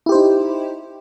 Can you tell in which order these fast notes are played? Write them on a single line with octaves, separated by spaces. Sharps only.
E4 G4 C5 D#4